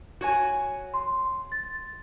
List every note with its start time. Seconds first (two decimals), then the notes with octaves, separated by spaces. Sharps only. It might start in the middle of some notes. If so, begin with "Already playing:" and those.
0.21 F#4 C#5 G#5
0.94 C6
1.52 A6